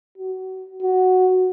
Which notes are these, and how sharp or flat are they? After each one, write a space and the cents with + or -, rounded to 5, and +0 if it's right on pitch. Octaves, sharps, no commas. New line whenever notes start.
F#4 +25
F#4 +0